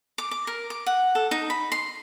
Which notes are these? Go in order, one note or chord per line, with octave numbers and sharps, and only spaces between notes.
D6
D6
A#4
D6
F#5
A4
D#4
B5
C6